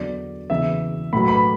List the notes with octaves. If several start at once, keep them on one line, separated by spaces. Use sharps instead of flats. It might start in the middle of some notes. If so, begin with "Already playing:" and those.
Already playing: E2 D3 F#3 D5
E2 C#3 E3 E5
A2 F#3 B5
B5